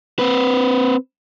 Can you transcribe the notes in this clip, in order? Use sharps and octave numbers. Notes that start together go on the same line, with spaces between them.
C4 B4